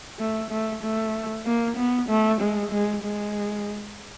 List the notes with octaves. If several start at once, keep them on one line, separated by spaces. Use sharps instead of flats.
A3
A3
A3
A#3
B3
A3
G#3
G#3
G#3